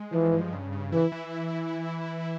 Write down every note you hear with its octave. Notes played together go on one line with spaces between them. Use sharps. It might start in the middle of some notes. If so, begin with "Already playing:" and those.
Already playing: G#3
E3 F3
G2
C#3
C#3
E3 E4
E3